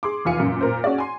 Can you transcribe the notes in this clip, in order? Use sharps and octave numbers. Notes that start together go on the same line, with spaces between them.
G#4 C6 D6
F1 E2 F4 F5 G#5 C#7
F#2 A#2 A#4
A#2 A#4 C5
C#4 F#4 G#4 D5
G#5 C6